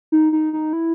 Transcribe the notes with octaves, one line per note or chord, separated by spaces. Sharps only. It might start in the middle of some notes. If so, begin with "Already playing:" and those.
D#4
D#4
D#4
E4